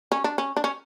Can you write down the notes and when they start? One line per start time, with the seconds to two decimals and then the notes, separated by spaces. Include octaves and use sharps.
0.12 C#4
0.24 D4
0.38 C#4
0.57 D4
0.64 C#4